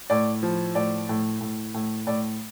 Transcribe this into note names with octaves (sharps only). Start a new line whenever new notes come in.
A2 D5
F3
A2 D5
A2
A2
A2
A2 D5